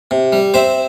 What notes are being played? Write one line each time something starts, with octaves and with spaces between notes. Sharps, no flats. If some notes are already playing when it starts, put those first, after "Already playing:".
C3
G3
C4 C5 E5